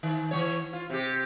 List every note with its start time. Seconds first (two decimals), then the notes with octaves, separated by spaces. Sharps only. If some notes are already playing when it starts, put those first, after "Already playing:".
0.03 D#3
0.31 E3 F#3 C#5
0.73 F4
0.90 C3 G4